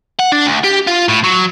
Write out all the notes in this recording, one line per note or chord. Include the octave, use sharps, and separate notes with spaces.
F#5
D4
D2
G4
F4
A2
F#3